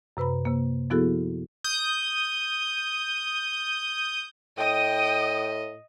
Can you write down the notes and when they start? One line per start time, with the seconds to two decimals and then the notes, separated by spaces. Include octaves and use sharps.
0.17 F#2 C3 B4 A#5 B5
0.45 C3 A#3
0.90 F3 B3 E4 F#4 G#4 A4
1.64 D#6 G6
4.58 A2 D#5 G5 D#6